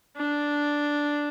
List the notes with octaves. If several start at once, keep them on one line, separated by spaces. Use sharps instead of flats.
D4